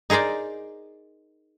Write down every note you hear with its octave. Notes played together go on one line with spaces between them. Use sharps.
D#4 G#4 A#4 C5 D5